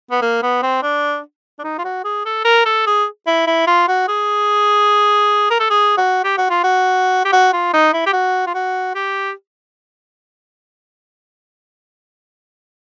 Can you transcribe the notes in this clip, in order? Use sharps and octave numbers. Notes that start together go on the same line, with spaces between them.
B3
A#3
B3
C4
D4
D4
D#4
F4
F#4
G#4
A4
A#4
A4
G#4
E4
E4
F4
F#4
G#4
A#4
A4
G#4
F#4
G4
F#4
F4
F#4
G4
F#4
F4
D#4
E4
G4
F#4
F4
F#4
G4